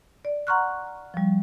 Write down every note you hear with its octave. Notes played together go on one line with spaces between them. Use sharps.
D5
F#5 A#5 C6 C#6 F6 F#6
F3 G3